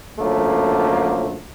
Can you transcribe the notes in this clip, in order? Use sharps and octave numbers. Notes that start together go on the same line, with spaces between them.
C#2 F#2 D3 F3 A3 A#3